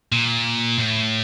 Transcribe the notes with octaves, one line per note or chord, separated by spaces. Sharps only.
A#2
A2